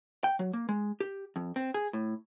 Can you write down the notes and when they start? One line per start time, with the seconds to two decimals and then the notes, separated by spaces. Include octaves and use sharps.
0.24 G5
0.39 F#3
0.53 A#3
0.69 G#3
1.00 G4
1.36 F2
1.56 C4
1.74 G#4
1.93 A2